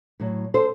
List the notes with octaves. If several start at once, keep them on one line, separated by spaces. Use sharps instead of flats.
A2 F#3
A4 C5